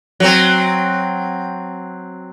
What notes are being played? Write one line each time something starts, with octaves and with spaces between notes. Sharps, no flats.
F#3 C4